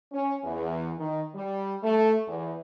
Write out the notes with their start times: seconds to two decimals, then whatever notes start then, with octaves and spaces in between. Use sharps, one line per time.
0.12 C#4
0.44 E2
0.98 D#3
1.35 G3
1.83 A3
2.28 E2